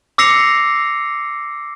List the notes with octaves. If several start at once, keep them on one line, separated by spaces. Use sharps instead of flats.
D6 E6 A#6 C7 C#7 F7